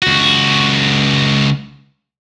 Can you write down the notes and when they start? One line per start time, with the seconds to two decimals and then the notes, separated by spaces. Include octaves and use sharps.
0.02 C#2 F#4